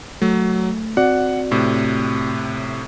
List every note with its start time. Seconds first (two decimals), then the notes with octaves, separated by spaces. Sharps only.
0.22 F#3 A3
0.97 C4 F#4 D5 F#5
1.51 A2 C3